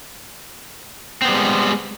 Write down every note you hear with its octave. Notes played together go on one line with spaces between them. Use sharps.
G3 G#3 B3 C4